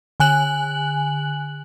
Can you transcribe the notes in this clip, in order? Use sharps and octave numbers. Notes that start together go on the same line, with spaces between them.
D3 G#5 F#6 F#7